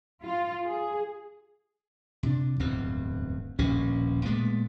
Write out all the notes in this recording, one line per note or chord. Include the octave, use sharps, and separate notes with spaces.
F4
G#4
C3 D4
D1 E2 G2 C4
D#1 A#1 B2 C#4
A#2 G#3 A3 B3